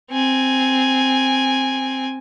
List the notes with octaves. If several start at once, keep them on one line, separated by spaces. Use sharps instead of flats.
C4 G#5